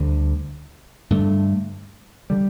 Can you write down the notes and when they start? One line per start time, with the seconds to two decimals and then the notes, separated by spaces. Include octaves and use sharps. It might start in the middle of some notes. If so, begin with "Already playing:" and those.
Already playing: D2 D3 G3
1.10 G2 D3 A3
2.30 D3 G3